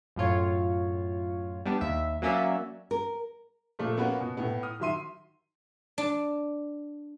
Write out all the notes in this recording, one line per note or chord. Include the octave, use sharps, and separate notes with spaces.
F#2 A2 F4 C#5
G3 B3 D4
D#2 E5
F#3 A#3 C#4 D5 E5
A#4
A#2 F3 A3
A#3 B3 C#4 F#4 B4
B2
A2 B3
D#6 F6
D#3 F#3 E5 C6 D#7
D4